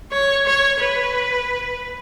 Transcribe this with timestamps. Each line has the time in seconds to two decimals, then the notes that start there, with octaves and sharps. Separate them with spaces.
0.11 C#5
0.46 C#5
0.81 B4